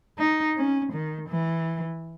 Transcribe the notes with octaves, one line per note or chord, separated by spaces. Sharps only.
D#4
C#4
D#3
E3